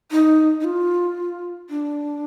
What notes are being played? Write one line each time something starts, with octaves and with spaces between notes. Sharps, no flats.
D#4
D#4
F4
D4